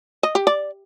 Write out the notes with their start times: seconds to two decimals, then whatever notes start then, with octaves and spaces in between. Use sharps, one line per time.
0.23 D#5
0.35 G4
0.47 D5